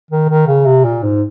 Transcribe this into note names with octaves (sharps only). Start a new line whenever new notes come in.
D#3
D#3
C#3
C3
A#2
G#2